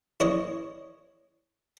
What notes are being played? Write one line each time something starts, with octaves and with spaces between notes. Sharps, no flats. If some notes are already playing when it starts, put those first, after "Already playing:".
E4 C#5 D#5